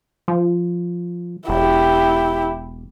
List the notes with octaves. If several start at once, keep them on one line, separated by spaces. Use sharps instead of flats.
F3
E1 E4 G4